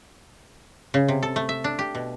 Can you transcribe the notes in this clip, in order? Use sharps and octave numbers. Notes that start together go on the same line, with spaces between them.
C#3
C3
A4
A3
E5
D4
G4
B2